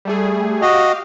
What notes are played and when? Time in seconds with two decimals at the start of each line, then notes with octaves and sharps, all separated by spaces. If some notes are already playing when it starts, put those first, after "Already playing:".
0.05 G3 A3 G#4
0.62 F#4 G4 D#5 F5